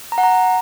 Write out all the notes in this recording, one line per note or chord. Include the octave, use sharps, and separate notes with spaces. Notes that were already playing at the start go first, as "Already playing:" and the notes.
A#5
F#5
A#5